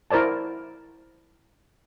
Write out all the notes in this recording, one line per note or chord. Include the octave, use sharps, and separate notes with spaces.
E4 A#4 C5 D5 A5